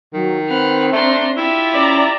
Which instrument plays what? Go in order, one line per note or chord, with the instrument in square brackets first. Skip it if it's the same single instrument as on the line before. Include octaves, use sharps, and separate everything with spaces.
[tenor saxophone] D#3 [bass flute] F#3
[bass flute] C4 [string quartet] B4 F#5 F6
[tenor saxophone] A3 [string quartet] D4 A#5 C6
[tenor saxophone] E4 [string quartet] F4 G4 E5
[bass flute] C#4 [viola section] D5 A#5